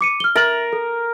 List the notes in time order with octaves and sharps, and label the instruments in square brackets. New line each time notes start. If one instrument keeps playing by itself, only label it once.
[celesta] D6 C#7 D#7
F6 G7
[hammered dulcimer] A#4 [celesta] E5 A6 F#7
[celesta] A4